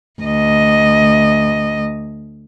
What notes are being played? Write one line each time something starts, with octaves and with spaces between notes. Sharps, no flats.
D2 D#5